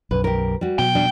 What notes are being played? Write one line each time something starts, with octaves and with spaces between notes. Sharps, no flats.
B1 F#2 B4
G4 A#4
G3 F#4
B2 F#3 G5
G3 D4